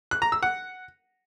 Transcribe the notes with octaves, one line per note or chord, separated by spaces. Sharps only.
F#6
A#5
E6
F#5